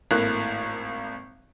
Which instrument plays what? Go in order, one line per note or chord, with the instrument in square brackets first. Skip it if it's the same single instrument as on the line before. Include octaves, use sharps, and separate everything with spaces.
[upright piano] G#1 A2 A#3 F#6